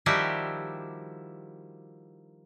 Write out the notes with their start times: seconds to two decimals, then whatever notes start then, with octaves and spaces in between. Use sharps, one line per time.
0.06 D#3 F3 G3 E4 F#4 G4